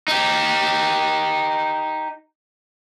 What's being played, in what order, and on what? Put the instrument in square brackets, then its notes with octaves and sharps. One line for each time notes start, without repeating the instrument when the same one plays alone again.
[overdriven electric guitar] D#4 G4